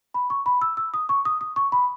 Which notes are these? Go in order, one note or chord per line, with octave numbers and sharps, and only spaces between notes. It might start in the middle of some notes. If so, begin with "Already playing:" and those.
B5
C#6
B5
E6
E6
D#6
C#6
D#6
D#6
C#6
B5